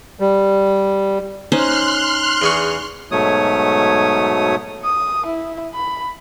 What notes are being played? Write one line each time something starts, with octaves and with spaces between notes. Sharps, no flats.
G3
C#4 D#4 C5 C6 F6 F#6
E2 G#4 C#6
G#2 B2 F#3 A3 C#5 D#6
D#6
E4
B5